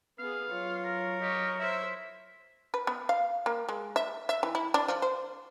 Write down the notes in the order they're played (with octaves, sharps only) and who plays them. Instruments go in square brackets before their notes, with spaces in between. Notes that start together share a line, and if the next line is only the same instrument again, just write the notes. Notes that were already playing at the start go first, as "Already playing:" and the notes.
[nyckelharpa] B3 G#4 [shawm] F5
[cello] F#3 C#5 [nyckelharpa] F4
[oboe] A#4
[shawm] G4 [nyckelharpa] D#5 C#6
[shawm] E4 [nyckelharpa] C5 E5
[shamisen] B4
B3
F5
A#3
G#3
E5
E5
E3
E4
D4
F3
C5